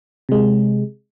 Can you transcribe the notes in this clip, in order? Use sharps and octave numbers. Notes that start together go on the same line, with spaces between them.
C3 G#3